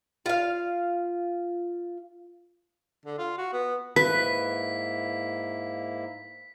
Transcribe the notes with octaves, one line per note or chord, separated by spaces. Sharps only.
F4 F5
D3
F4
F#4
B3
G#2 A#3 E4 B4 B6